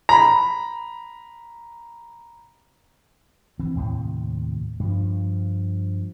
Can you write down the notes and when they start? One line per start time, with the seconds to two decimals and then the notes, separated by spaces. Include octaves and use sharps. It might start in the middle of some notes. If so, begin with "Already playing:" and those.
0.09 A#5 B5
3.59 E3 C4
3.75 D#2 A2 C3
4.80 G2 F3